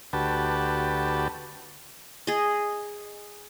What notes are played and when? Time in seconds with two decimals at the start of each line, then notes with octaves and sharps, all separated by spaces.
0.13 D2 F#4 G4 B4 A5
2.27 G#4 D#5